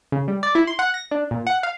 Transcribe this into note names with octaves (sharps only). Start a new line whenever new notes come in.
C#3
G3
D5
E4
C6
F#5
A#6
D4
A#2
F#5
F5